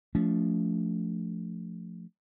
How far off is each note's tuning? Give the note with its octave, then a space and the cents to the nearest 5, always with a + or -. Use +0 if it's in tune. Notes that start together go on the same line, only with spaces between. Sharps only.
F3 +0 A3 +0 D4 -45